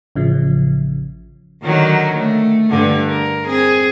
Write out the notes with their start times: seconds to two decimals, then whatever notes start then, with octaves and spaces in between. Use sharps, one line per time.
0.16 A1 C#3 F3
1.63 D3 D#3 F#3
2.18 A3
2.70 G2 D3
3.09 A#4
3.45 C4 G#4